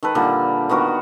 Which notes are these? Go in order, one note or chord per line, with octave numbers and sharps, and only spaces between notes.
D#3 A4 B4
A#2 D3 G3 A#4
D#3 B3 F#4 A#4